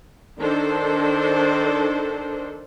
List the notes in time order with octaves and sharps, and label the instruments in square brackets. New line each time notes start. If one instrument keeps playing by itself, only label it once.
[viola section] D#3 D4 A4 C5